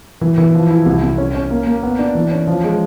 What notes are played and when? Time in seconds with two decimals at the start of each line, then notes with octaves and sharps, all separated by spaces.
0.21 E3
0.38 E3
0.54 F3
0.71 E4
0.86 C2
1.02 C2
1.18 C#4
1.35 C#4
1.51 A#3
1.67 A#3
1.83 B3
1.99 D4
2.15 E3
2.32 C#4
2.47 F3
2.64 G#3